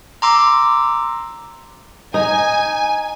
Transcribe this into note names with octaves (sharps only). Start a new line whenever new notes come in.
A#5 C6 D6 E6
D#4 G#5